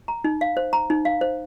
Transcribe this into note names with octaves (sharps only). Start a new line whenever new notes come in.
A#5
D#4
F5
C5
A#5
D#4
F5
C5